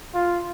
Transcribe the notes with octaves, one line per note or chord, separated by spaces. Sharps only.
F4